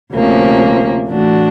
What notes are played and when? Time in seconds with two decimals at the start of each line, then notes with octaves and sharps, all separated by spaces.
0.12 D2 C3 F3 A#3 C#4
1.07 A2 E3 A3 D4 F#4